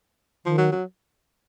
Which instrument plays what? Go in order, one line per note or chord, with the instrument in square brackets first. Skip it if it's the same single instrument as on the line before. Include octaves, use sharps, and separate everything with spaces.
[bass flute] D#3 [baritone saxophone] F3
[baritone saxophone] F#3
F#3